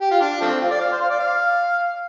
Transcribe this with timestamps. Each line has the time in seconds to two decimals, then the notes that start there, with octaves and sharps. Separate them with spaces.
0.01 G4
0.11 F4
0.21 D4
0.41 F3 A3 C4
0.61 F4
0.71 D5
0.81 F5
0.92 C5
1.02 F5
1.10 D5
1.20 F5